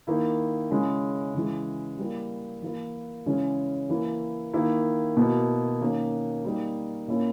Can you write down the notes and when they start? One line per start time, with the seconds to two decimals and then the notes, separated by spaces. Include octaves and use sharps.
0.07 D#3 A#3 E4
0.71 C#3 G#3 C#4 E4
1.34 C#3 E3 G#3
1.98 G3 A#3 E4
2.62 E3 A#3 E4
3.26 C#3 E3 G#3 C#4
3.89 E3 A#3 E4
4.53 D#3 A#3 E4
5.17 B2 A#3 E4
5.81 D#3 A#3 C#4
6.45 G3 A#3 D#4
7.08 A#2 A#3 C#4 E4